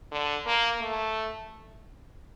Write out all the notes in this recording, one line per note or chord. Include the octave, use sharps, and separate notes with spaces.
D3
A#3
A3